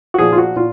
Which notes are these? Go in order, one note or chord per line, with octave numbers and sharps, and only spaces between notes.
F#4
A#2 F3 G#4
F4
F#4
A#2 F4